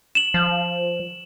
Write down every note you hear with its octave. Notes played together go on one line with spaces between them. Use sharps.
E7 F#7
F3